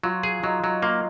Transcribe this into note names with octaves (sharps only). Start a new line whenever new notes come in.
F#3 F4
G#4
F#3 D#4
F#3
A#3 F4